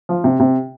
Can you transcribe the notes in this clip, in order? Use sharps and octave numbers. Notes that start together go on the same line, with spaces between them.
F3
C3
C3